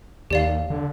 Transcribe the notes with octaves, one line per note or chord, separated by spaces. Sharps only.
D#2 G4 D5 F5
D3